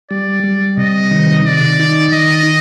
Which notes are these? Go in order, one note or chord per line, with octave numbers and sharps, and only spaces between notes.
G3 D5
G3
C3 D#5
D#3
D#3 D5
D#4
D#3 D#5